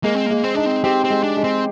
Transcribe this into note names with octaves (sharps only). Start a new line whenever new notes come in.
G#3 A#3
C4
G#3 A#3
C4
D4 D#4
C4
C4 G4
C4
G#3
D4
G#3
C4